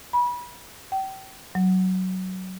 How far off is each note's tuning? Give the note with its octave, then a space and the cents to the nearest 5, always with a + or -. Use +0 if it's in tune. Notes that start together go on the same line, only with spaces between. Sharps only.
B5 -30
G5 -30
F#3 +10